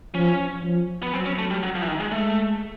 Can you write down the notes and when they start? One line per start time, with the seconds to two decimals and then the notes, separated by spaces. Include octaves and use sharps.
0.14 F3 C#4
0.64 F3
1.02 B3
1.13 F#3 C4
1.26 C#4
1.38 A3
1.51 G3
1.63 F#3
1.75 F3
1.82 E3
1.87 D#3
2.00 G#3
2.12 G#3 A3